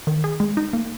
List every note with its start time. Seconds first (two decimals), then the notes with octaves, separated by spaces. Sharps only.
0.07 D#3
0.24 G#4
0.40 G#3
0.57 D#4
0.73 A#3